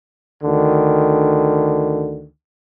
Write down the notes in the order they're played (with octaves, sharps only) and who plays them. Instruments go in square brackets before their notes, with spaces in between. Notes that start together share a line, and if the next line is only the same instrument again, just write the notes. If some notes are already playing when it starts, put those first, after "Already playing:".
[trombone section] D2 D3 D#3